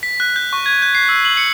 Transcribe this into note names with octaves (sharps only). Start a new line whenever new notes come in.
B6
F#6
G6
C#6
G#6
G6
C7
E6
F#7
C#7